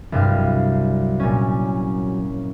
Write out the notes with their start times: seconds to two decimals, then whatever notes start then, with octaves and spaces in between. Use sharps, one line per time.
0.12 C2 G2 F#3 F5
1.20 A#2 C#4